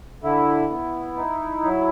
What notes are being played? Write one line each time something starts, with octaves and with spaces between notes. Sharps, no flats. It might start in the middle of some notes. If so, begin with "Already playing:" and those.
D3 E4
B3
D#4
F#3